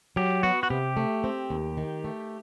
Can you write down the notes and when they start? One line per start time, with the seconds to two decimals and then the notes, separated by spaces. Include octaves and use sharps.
0.16 F#3 G4
0.43 B3 F#4
0.63 F#4
0.70 C3 G4
0.97 A3
1.24 C4
1.50 D#2
1.77 D#3
2.04 A3